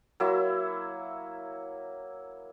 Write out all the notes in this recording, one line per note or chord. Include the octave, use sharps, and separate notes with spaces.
F#3 A#3 E4 E5